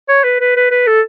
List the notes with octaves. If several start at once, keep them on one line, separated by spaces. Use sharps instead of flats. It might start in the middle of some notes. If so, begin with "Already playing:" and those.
C#5
B4
B4
B4
B4
A4